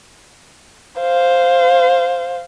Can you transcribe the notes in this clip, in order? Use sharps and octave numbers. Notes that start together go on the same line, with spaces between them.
C5 F5